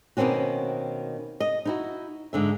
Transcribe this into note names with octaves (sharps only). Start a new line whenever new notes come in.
B2 D#3 A#3 C4 C#4 F#4
D#5
D#4 E4 F#4
G#2 D3 E5